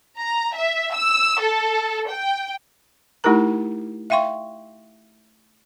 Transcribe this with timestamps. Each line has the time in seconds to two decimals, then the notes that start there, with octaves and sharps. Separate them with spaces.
0.18 A#5
0.56 E5
0.94 E6
1.41 A4
2.10 G5
3.24 A3 D#4 E4 G4 A#4 A#5
4.10 E5 F5 G5 C6 C#6